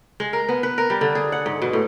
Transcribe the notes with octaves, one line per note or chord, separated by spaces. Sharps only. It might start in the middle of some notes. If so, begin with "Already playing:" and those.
G#3
A#4
B3
B4
A#4
G3
D3
G#4
F#5
G#2
B2
A2